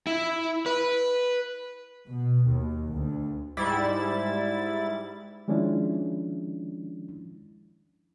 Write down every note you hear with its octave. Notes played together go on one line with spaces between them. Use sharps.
E4
B4
B2
D#2
D2
G#2 G3 E4 A6
D#3 F3 G#3 C#4 D4 E4